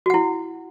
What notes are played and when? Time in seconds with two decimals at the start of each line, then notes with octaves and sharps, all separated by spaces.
0.06 F#4
0.10 F#5
0.14 E4